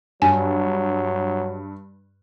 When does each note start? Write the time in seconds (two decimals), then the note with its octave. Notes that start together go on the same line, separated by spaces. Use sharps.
0.22 G2 F#3 G#5